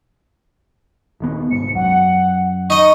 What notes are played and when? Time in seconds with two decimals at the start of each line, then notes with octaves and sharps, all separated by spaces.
1.20 D#1 D#3 B3
1.51 C2 G#2 C#7
1.75 F#2 F#5
2.70 D#4 D#5 C#6